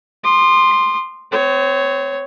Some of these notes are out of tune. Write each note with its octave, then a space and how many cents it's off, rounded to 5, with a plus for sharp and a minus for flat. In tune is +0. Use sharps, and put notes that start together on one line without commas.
C6 +0 D#6 -45
C4 -35 C#5 +0